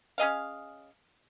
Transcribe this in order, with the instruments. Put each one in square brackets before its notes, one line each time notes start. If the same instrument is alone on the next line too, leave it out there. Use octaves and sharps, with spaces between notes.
[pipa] C#4 G#4 D#5 F5